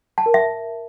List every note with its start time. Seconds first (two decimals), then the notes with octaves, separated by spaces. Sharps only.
0.18 A5
0.26 A#4
0.34 E5